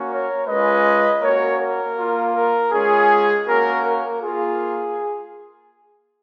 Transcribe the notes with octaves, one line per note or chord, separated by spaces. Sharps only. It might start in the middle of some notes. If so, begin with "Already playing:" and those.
Already playing: A#3 C#4 F#4
A#4 C#5
G#3 C#4 F4 B4 D#5
A#3 C#4 F#4 A#4 C#5
A#4
A#3 F4
A#4
G#3 C#4 F4 G#4
A#3 C#4 F#4 A#4
A#4
A#3 F4 G#4